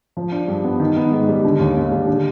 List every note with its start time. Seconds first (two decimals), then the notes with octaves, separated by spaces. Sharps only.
0.17 F3
0.32 D4
0.48 G2
0.64 B3
0.80 D#3
0.97 B3
1.12 G#2
1.28 G3
1.45 D3
1.59 D#2
1.76 D#2
1.91 G3
2.07 D3